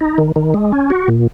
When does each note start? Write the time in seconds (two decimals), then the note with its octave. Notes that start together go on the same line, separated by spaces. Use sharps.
0.01 D#4
0.18 D#3
0.36 D#3
0.54 G#3
0.72 C#4
0.90 F#4
1.08 A#2